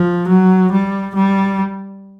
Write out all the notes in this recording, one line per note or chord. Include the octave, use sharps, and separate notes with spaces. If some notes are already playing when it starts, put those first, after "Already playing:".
Already playing: F3
F#3
G3
G3